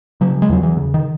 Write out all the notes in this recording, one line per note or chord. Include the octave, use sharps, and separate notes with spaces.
C#3 F#3
G#3
E2 F#3
E3
C#3
D#3